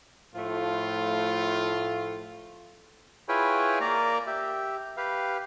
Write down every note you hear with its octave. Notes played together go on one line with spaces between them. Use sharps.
A2 F3 A3 F4
E4 F4 G#4 B4 C#5 G5
A#3 A#4 D5 A#5
G4 E5
G4 B4 F5